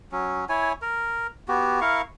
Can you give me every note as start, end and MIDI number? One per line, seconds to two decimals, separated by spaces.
0.12 0.45 54
0.12 0.45 61
0.49 0.73 64
0.49 0.73 73
0.49 0.73 80
0.82 1.27 70
1.48 1.80 59
1.48 1.80 66
1.48 1.80 67
1.81 2.02 64
1.81 2.02 70
1.81 2.02 77
1.81 2.02 85